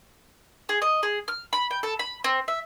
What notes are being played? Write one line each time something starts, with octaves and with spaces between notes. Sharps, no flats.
G#4
D#5
G#4
F6
B5
G5
A4
B5
C4
E5